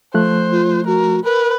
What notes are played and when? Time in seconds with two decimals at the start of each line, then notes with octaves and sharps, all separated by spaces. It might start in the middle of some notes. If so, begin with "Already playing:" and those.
0.14 F3 A3 C5 F#6
0.51 F4
0.87 F#4 A#4
1.25 A#4 B4